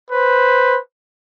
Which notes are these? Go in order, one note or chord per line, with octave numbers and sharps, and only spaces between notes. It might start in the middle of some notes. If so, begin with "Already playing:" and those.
B4 C5